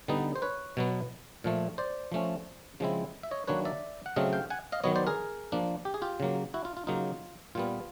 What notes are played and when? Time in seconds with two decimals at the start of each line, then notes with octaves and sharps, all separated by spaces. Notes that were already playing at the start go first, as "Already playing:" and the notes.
0.08 D3 G3 B3 D#4
0.36 C5
0.42 B4 C#5
0.77 B2 F#3 B3
1.44 A#2 F3 A3
1.78 C5 D5
2.12 F3 A3 C#4
2.80 C#3 F3 G#3 C4 E4
3.23 E5
3.31 C#5 D#5
3.47 D#3 F#3 A#3 D4 B4 C#5
3.65 D5 E5
4.06 F#5
4.16 C#3 F#3 A3 C4 D#5 F5
4.33 F5 G5
4.50 F#5 G#5
4.72 D#5 F5
4.84 D#3 F#3 B3 C#5 D#5
4.96 C5 D5
5.07 G#4 A#4
5.52 F3 A#3 D4
5.85 G4
5.94 G#4
6.02 F4 G4
6.20 C#3 F#3 A#3
6.54 E4 F#4
6.65 F4
6.77 F4
6.87 C#3 F#3 A#3 D#4 F4
7.55 A#2 G3 B3 F4